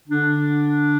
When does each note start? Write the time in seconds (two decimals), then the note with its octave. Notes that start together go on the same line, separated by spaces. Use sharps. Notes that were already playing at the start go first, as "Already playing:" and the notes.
0.08 D3 D4